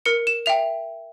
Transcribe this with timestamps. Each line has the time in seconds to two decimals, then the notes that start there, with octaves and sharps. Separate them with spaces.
0.06 A#4 C#7
0.27 E7
0.46 E5 G5 F7